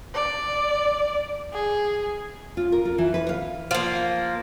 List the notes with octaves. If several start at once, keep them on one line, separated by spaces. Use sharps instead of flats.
D5
G#4
F4
A#4
F4
E3
B4
F5
F3 A#3